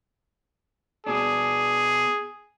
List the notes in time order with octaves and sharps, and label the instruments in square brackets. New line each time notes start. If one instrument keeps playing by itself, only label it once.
[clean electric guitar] B2 D4 [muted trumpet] G#4